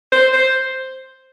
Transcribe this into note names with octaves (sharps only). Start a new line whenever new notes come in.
C5
C5